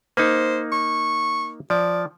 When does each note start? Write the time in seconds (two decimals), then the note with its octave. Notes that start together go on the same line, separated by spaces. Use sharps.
0.17 A#3 D#4 C5
0.72 C#6
1.70 F3 D5